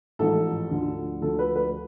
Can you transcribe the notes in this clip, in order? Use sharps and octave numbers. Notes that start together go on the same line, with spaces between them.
A1 G#2 F3 A4
D2 D3 F3
D2 D3 F3 A4
B4
B4